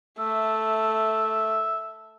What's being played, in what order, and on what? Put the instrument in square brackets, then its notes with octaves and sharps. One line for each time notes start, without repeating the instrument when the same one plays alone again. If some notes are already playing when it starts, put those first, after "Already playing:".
[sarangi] A3 [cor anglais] E5